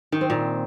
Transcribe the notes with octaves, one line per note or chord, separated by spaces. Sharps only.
D#3
C4
A#2